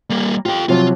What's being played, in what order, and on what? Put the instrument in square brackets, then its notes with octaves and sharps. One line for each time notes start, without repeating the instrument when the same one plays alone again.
[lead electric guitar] G3 A#3
[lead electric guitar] F4 G5 [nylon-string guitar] G4
[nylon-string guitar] C3 F3 F#3 [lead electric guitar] F4